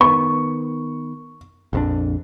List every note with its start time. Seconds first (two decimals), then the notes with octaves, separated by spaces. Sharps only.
0.01 D#3 B3 C#6
1.73 A#1 F2 D4